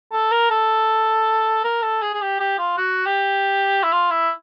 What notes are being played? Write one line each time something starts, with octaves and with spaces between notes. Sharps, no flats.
A4
A#4
A4
A#4
A4
G#4
G#4
G4
G4
F4
F#4
G4
E4
F4
E4